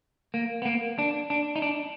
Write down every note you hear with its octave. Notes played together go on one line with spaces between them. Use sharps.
A#3
B3
A#3
D4
D4
D#4
D4